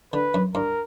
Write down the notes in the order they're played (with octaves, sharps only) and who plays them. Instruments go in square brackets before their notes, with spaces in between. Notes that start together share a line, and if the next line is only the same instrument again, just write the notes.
[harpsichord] D3 [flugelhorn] B4
[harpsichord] F#2
[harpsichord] G2 [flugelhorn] A#4